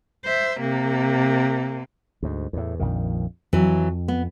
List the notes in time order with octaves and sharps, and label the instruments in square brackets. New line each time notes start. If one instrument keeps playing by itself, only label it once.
[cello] C5 E5
C3 A#3
[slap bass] D2 G#2
E2 A2
A#1 F2 D#3
[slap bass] F2 [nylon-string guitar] E3 F#3
[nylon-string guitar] B3